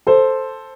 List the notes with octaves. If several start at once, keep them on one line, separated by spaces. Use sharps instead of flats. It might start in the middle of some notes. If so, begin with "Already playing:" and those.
A4 C5